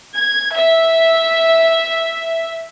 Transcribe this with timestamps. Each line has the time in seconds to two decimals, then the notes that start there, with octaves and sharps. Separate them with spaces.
0.15 G#6
0.55 E5